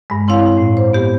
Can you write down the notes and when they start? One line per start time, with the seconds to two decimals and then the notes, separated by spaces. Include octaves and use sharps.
0.10 G2 G#3
0.28 C4 E4 C#5 F5
0.57 A2
0.77 C5
0.93 B3 G4